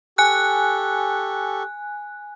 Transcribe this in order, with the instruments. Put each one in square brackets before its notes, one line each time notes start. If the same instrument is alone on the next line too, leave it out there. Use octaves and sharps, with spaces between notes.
[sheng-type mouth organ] G4 A4 C#6 [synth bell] G#5 F#6